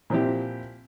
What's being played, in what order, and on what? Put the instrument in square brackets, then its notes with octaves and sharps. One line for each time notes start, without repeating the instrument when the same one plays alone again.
[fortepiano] A#2 F3 C4 E4 G4